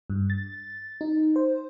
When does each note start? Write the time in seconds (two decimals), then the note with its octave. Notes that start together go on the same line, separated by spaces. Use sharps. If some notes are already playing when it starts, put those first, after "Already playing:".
0.10 G2
0.30 A6
1.01 D#4
1.36 C5